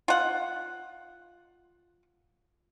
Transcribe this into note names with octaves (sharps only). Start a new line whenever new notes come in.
F4 F#5